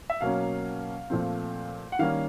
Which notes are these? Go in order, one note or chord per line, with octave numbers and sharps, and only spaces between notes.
E5
B2 F#3 A#3 C#4 F5
A#2 F3 A3 C4
F#5
D#3 G3 A#3 C#4 F5